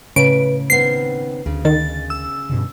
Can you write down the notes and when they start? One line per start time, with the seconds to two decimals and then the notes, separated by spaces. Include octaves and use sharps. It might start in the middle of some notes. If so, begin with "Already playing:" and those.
0.16 A2 C#3 B4 D7
0.70 D#3 B3 C4 C7
1.46 D2 C#3
1.65 D#3 A6
2.10 E6
2.49 G2 B2 D3